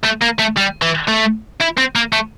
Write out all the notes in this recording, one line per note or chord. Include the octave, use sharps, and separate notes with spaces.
A3
A#3
A3
G3
E3
A3
E4
C4
A#3
A3